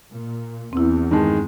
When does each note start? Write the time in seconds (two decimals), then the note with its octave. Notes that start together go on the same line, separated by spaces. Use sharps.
0.13 A#2
0.73 E2 C4 E4
1.11 G2 D#3 G#3 A5